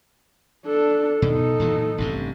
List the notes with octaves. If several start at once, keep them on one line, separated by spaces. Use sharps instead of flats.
D4 A4
B2 D#4 A4
A#2 E3 F#3
A1 G2 C3